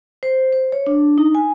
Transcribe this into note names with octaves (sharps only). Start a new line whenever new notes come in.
C5
C5
C#5
D4
D#4
G#5